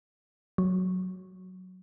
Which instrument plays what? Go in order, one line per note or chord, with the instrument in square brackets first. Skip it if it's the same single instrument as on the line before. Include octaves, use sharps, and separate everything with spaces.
[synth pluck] F#3